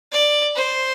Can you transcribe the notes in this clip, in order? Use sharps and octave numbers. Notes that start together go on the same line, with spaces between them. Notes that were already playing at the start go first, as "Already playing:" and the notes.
D5
C5